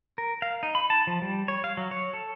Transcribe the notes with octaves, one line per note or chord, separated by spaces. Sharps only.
A#4
F5
D#4
B5
A5
F3
G3
C#5
F5
F#3
C#5
A4